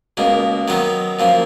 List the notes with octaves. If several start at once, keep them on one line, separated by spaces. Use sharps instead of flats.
C#2 B2 A#3
D#3 F#3 B3 D#4
F#2 F3 A#3